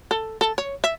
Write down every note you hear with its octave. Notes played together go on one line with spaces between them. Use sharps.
A4
A4
C#5
E5